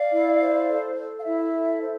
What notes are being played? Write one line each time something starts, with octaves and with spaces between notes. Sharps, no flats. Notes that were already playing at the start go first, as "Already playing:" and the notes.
Already playing: D5 F5
E4
C5
A4
A4
F5
E4 E5
A4
C5